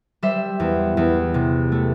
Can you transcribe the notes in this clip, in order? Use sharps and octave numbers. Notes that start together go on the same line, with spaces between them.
G3 C5 E5
E2
E2
C3
A3